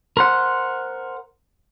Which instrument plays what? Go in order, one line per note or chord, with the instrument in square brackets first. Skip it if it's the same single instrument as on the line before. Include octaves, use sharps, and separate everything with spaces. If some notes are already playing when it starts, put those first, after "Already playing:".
[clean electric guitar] A#4 C5 F#5